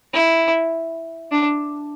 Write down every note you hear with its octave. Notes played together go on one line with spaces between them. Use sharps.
E4
D4